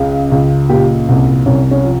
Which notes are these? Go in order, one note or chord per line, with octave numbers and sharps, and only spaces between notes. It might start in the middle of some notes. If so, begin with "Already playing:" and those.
Already playing: C#2 C#3
C#2
A#2 G4
C2
C2 C#4
C#4
F3